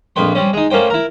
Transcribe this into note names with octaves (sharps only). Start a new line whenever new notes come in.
A#1 F2 B4 G5 C6
G3 C4 C#4
G#3 D#4
A3 A#3 C#4 C5 G5
E4 A#4